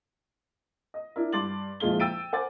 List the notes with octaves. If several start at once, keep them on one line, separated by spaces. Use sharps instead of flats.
D#5
D4 E4 A#4
G2 C6 D6 A6 F#7
F#1 F2 A#2 G#3 F4 G7
G5 E6 A6 D7 D#7
A#4 C5 F#5 G#5 D6 A6